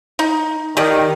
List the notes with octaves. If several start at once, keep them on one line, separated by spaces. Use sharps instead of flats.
D#4
D#3 G4 D5 D#5